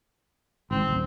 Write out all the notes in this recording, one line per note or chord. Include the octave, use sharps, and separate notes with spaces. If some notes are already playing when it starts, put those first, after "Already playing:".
G#1 C4
D#1 G#1